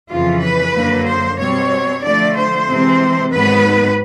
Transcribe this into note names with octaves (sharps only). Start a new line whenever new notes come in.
F2 C#3 E3 F4
B4
F#2 D3 F#3 A#3
C5
B2 G3 C4 C#5
D3 F3 A3 D5
C5
C3 E3 G#3 C4
G#2 D#3 F#3 B3 B4